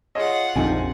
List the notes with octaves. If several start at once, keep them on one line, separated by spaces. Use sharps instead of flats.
F4 G#4 C#5 D#5 F#5
A#1 F2 C3 D4 D#4 G#5